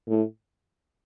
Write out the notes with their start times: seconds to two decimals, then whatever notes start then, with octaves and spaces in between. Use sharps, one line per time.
0.09 A2